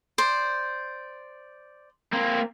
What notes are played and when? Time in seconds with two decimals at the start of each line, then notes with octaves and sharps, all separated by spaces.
0.18 C5 D5
2.13 A#3 C4